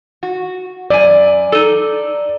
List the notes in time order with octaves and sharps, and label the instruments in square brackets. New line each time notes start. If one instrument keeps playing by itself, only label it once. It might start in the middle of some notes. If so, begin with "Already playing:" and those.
[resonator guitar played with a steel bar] F#4
[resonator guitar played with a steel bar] F#2 G#5 [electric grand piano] D5
[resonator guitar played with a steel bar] D#4 A4